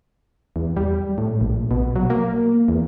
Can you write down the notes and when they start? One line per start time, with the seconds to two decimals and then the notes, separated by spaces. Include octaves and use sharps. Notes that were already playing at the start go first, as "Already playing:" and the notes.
0.56 E2
0.76 G3
1.18 A2
1.41 A#1
1.71 B2
1.96 F#3
2.10 A#3
2.68 E2